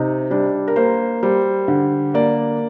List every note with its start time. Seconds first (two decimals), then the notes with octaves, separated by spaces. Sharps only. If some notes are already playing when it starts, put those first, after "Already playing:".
Already playing: C3 D#4
0.30 G3 D4
0.68 A#4
0.76 A#3 C5
1.23 G3 C5
1.68 D3
2.14 A#3 D5